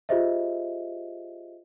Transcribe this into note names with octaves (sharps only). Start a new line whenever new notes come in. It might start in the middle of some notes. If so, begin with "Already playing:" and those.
F4 G4 G#4 C5 D#5 E5